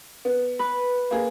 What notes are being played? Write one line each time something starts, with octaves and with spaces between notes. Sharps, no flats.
B3
B4
A#3 G#4